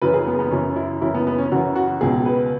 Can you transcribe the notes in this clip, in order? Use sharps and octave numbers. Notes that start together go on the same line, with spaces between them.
F#2 C#3 E3 B4
G#4
B3
B3
F#2 C#3 E3 C#4
E4
F#2 C#3 E3 E4
B3
B3
C#4
F#2 C#3 E3 F#4
F#4
C#2 B2 G#4
B4